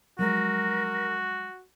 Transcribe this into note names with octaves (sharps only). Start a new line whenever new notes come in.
F3 F#3 G#3 F#4 A#4